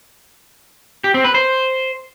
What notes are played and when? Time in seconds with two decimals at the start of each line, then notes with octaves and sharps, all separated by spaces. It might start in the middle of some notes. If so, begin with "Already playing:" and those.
1.04 G4
1.14 C4
1.24 B4
1.35 C5